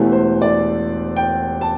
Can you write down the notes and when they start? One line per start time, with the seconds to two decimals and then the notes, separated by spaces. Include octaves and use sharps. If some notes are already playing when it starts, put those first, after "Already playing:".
Already playing: E1 E2 E3 A3 G4
0.12 C5
0.42 D5
1.16 G5
1.61 A5